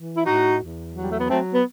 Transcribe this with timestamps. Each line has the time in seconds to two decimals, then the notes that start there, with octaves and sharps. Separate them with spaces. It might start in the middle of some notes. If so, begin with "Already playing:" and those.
Already playing: E3
0.17 E4
0.26 A2 D#4 F#4
0.61 E2
0.95 F#3
1.01 G3
1.11 A3
1.20 B3
1.29 F#3 A3 C4
1.53 B3